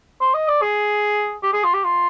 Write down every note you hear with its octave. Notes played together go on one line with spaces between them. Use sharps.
C5
D#5
D5
G#4
G4
G#4
F4
G4
F4